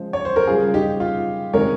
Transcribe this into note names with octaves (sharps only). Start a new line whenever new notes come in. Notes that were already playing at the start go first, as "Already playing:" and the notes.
Already playing: C#3 F3 G#3 C5
C#5
C5
A#4
C#3 G3 F4 G#4
D#4 G4
F4
C3 D#3 G#3 A#4 C#5